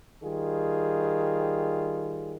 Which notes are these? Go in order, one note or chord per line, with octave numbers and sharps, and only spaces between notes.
D#3 G3 F4 G#4